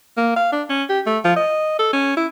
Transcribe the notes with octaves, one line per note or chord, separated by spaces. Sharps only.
A#3
F5
D4
C#4
G4
A3
F3
D#5
A4
C#4
E4